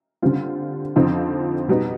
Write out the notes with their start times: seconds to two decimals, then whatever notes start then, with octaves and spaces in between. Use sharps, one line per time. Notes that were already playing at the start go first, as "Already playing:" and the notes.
0.22 D3 G3 C4 F4
0.96 F2 D3 F3 C4 D#4
1.68 B2 G3 B3 D#4